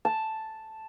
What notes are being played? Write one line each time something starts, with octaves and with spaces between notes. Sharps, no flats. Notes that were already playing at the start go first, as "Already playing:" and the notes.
A5